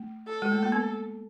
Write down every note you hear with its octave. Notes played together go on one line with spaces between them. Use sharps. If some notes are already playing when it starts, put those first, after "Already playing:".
Already playing: A3
A4
G#3
A3
A#3
B3